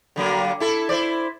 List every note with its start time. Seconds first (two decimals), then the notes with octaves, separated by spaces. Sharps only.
0.16 D3 F#3 A#3
0.60 E4 A4
0.89 E4 C5 D5